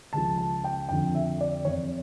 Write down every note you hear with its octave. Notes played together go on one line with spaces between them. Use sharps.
C#2 C#3 F3 A5
A5
G5
F2 D3 F3 G5
E5
D5
F2 E3 C#5